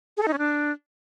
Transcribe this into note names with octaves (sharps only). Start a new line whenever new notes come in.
G#4
A4
D#4
C#4
D4